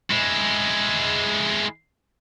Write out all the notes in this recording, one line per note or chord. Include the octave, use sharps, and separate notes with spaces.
G#3 E4